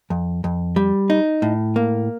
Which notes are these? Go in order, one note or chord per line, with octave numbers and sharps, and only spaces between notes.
F2
F2
G3
D#4
A2
A#3